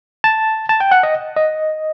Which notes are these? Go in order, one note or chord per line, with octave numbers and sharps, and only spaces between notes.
A5
A5
G5
F#5
D#5
D#5